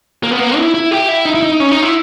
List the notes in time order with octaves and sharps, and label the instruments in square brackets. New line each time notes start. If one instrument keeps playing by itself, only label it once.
[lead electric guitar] A#3
B3
A#3
E4
E4
G4
E4
D#4
E4
D#4
C#4
D#4
E4